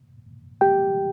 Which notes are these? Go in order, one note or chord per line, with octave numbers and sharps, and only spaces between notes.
G4 G5